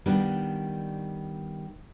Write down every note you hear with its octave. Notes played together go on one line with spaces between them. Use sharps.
D#3 G3 B3 D4